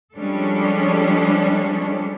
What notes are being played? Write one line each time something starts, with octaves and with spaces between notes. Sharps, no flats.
F3 G3 G#3 C#4 D4 A4